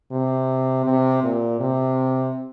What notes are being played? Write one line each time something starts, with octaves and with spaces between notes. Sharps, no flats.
C3
C3
A#2
C3